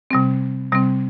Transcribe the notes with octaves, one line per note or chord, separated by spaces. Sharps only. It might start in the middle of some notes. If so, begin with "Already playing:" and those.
C3 G3 C4
C3 G3 C4